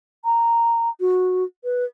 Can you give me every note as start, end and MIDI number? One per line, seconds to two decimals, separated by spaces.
0.25 0.89 82
1.00 1.44 66
1.64 1.85 71